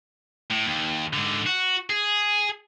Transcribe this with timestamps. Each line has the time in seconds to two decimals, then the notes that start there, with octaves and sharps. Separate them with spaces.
0.51 A2
0.67 D#2
1.13 G#2 D3
1.46 F#4
1.90 G#4